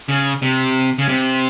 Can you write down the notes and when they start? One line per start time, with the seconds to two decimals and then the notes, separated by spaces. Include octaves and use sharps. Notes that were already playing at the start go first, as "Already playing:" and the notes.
0.09 C#3
0.42 C3
0.99 C#3
1.09 C3